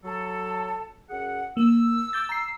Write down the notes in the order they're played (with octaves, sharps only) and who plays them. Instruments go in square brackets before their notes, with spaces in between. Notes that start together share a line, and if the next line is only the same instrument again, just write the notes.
[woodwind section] F#3 A4
F#2 G#4 F#5
[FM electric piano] A#3 [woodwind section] E6
[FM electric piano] D6 G6 A6
A#5 C7